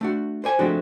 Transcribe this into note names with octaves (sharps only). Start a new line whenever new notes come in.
A3 D4 F#4
C5 D5 G#5
F3 G#3 A3 C4 D4 F#4